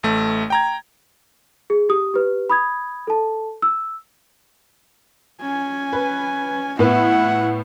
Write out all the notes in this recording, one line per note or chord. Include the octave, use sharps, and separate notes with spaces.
A1 A3
G5 A#5 G#6
G#4
G4 D#6
G4 B4
B5 D#6 G#6
A4 A5
E6
C#4 G#5
B4
A2 B3 E4 F#5